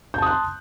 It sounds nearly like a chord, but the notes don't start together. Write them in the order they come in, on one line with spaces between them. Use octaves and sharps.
G6 A5 D#6 F#6 C6